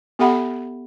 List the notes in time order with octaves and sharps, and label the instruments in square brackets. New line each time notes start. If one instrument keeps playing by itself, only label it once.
[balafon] B3 G4 A4 E5 F#5 B5